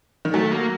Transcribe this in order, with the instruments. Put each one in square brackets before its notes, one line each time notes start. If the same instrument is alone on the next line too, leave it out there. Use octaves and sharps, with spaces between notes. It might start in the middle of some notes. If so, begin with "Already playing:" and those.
[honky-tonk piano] D#3
[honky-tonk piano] F#3 [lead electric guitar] A3
[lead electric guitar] A#3